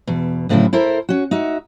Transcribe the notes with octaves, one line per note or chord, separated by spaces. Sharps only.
E2 B2
D2 A2 C#3 E3 F#3 E4
E4 A4 A#4 C5 E5
C#4 F#4
D#4 F#4 E5